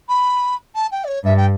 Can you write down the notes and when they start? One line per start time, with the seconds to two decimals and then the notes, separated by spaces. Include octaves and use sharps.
0.09 B5
0.75 A5
0.91 G5
1.04 D5
1.07 C#5
1.24 G2 E5
1.37 G5